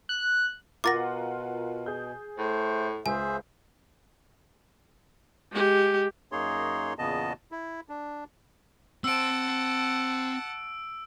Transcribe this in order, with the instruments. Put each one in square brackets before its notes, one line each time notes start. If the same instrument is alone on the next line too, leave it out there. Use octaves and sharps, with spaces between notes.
[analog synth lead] F#6
[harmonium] B2 [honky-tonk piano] F4 A#4 F#5 [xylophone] D6 A6 A#6
[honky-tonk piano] G#4 G6
[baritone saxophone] A2 [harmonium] A3 C5
[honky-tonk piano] C#2 [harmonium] G#4 C5 E5 [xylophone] G#5
[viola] G#3 G4
[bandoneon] F#2 A#3 D#4 G#4 C#5 C6
E2 A#2 C#3 B3 D#5 A5
E4
D4
[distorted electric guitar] C4 C5 [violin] F#5 A5 [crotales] E6 D7